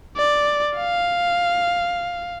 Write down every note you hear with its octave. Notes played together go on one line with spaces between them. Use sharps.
D5
F5